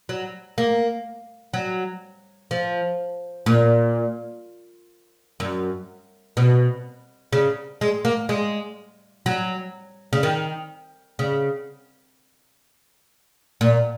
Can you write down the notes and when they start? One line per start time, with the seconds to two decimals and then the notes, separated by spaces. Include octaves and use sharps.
0.09 F#3
0.58 A#3
1.54 F#3
2.51 F3
3.46 A#2
5.40 F#2
6.37 B2
7.33 C#3
7.81 G#3
8.05 A#3
8.29 G#3
9.26 F#3
10.13 C#3
10.23 D#3
11.19 C#3
13.61 A#2